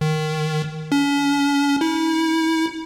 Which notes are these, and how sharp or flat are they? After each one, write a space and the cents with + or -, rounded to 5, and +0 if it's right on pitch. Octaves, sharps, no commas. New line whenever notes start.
D#3 -5
C#4 +40
E4 -35